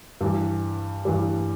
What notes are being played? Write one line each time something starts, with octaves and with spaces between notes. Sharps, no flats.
G2 E3 G3
G2 E3 G3